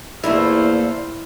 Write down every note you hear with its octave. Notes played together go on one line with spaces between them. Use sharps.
E2 A#2 A3 A#3 E4 C5 F5